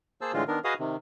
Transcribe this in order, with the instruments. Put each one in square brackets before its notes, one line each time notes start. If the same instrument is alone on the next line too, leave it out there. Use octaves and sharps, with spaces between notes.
[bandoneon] A#3 G#4 C5 A5 E6
A2 D3 E3 G#3 F4
D#3 B3 D4 A#4
F#4 G#4 B4 D#5 F5 D#6
C3 D#3